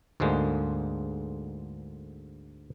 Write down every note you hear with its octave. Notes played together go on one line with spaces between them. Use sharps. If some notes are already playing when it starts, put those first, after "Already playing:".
D2 G#2 D3 G#3 A#3